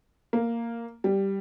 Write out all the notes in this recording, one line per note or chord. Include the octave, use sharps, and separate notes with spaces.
A#3
G3